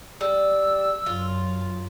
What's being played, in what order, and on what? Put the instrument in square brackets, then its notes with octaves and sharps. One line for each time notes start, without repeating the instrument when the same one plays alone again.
[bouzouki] G3 [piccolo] E6
[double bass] F#2 [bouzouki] F4